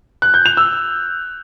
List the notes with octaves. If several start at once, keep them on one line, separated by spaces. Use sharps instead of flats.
F#6
G6
F7
E6